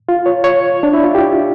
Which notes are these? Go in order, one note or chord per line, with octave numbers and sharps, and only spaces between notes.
F4
C#5
C#5
D4
E4
F4
G4